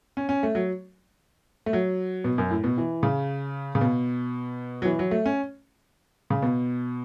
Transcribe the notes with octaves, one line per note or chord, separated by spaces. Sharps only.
C#4
C#4
A3
F#3
A3
F#3
B2
F#2
A2
B2
E3
C#3
C#3
B2
F#3
E3
F#3
A3
C#4
C#3
B2